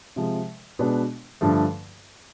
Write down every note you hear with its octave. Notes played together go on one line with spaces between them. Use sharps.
C3 F3 G#3
B2 G#3 B3 D4 F#4
G2 D3 F3 A3